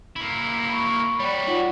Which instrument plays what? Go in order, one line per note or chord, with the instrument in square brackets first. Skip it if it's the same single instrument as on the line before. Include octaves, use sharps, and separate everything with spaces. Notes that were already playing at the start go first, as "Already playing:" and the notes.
[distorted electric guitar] A#3 E4
[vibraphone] B5 C#6
[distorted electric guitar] G3 F#4 [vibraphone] C#5 D5
[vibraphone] D#4 F4 F#5